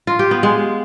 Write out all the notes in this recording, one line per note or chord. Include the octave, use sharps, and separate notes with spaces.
F4
G4
B3
G#3